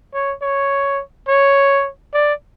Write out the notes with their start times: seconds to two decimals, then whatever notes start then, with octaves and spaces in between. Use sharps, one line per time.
0.14 C#5
0.42 C#5
1.28 C#5
2.13 D5